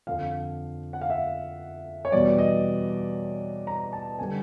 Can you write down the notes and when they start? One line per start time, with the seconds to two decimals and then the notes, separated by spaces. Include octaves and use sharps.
0.07 F2 D3 F3 F5
0.93 F#5
1.01 F5
1.10 E5
2.05 C#5
2.12 E2 B2 G3 D5
2.38 D#5
3.67 A#5
3.93 A5
4.19 D3 G3 G#5